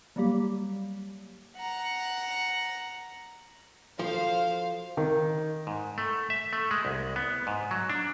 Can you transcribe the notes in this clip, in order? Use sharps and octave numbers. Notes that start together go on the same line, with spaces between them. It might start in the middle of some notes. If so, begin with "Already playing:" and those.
F#3 G3 A#3 G4
F#5 A#5
F3 F#4 A4 C5 F5
D#3
G#2
A3
E5
A3
G#3
C2
B3
G#2
F#3
D4